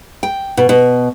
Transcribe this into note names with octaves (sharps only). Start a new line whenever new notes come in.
G5
B2
B2